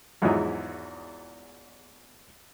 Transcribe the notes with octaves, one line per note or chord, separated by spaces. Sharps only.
E2 G#2 F3 F#3 D#4 E4